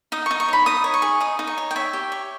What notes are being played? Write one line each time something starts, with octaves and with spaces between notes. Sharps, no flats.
D#4 D#6
D#4 C#6
C#6
C#5 B5
D#4 D#6
C#5
C#6
G#4
D#4 D#6
D#4
C#6
C#5
G5
C#5 E5
G4
C#5